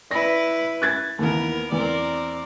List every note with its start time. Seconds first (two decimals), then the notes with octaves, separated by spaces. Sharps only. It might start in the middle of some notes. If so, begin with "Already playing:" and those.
0.11 E4 B4 D5 A#6
0.82 F#6 G#6 A6
1.19 D#2 E3 B3 A#4
1.72 E2 C4 A#4 D5